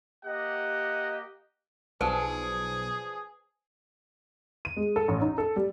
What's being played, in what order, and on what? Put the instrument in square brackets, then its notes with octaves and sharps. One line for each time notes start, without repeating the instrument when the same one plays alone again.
[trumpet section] A#3 G4 D#5 F#5
[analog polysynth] B1 [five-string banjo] F3 D4 F#4 [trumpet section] G#4 [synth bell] B4 C5 A5
[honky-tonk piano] D#7
G#3
A4
A1
D#4
A4
G3